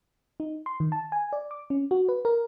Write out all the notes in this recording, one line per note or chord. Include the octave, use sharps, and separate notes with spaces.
D#4
C6
D#3
A5
G#5
D5
D6
C#4
F#4
B4
A#4